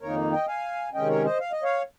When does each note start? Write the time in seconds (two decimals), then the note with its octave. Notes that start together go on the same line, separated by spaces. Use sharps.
0.01 F2 D#3 A#3 D#4 A#4 C#5
0.32 D#5 G5
0.47 F5 G#5
0.93 C3 D#3 G#3 C#4 D#5 G5
1.09 A#4 C#5
1.24 C5 D#5
1.40 F5
1.52 D#5
1.63 C#5 F5